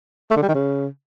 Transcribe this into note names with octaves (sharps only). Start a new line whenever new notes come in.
A3
D3
G3
D#3
C#3